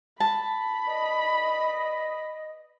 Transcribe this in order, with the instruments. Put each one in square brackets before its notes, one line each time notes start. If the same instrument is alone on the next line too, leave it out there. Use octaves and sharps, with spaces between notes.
[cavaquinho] A5 [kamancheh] B5
[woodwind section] B4 D5 D#5